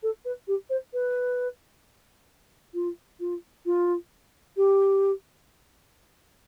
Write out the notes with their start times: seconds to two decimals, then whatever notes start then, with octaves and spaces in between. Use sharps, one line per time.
0.03 A4
0.25 B4
0.47 G4
0.69 C5
0.93 B4
2.74 F4
3.20 F4
3.66 F4
4.56 G4